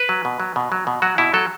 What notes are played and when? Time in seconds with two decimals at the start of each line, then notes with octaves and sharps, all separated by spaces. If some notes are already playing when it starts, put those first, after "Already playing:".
Already playing: B4
0.09 F#3
0.25 B2
0.40 F#3
0.56 B2
0.72 F#3
0.87 B2
1.02 F#3 F#4
1.18 B2 E4
1.34 F#3 A4